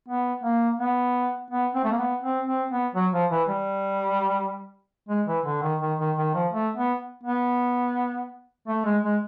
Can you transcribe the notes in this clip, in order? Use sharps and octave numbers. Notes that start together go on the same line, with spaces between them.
B3
A#3
B3
B3
C4
A3
A#3
B3
C4
C4
B3
F#3
F3
E3
G3
G#3
E3
D3
D#3
D#3
D#3
D#3
F3
A3
B3
B3
A3
G#3
G#3